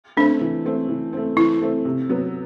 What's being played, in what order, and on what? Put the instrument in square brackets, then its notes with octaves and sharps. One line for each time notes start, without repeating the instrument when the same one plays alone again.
[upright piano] A3 C4 [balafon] D4
[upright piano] E3
A3 C4
E3
A3 C4
[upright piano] E3 [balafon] E4
[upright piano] A3 C4
C3
F#3 B3